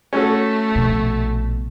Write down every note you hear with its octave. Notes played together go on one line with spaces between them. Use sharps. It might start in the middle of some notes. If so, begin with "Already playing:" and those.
A3 C#4 F#4 A4
A#1 B2